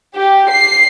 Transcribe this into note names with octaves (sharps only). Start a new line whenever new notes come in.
G4
C7